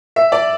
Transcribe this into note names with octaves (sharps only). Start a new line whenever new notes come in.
E5
D5